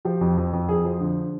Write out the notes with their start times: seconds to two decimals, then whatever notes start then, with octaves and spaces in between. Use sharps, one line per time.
0.05 F3 G4
0.21 F2
0.37 F2
0.53 F2
0.68 F2 G#4
0.85 F3
1.01 D3